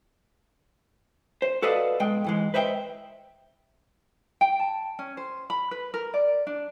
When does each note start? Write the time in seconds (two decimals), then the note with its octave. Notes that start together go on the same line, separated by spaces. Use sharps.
1.42 C5
1.62 F#4 A4 B4 D5 D#5 F5
2.00 B1 G#3 G5
2.24 G#2 E3 G#3
2.54 B4 C5 D#5 E5 F#5 G5
4.41 G5
4.59 A5
4.99 C#4
5.17 C5
5.50 B5
5.71 B4
5.94 A#4
6.14 D5
6.47 D4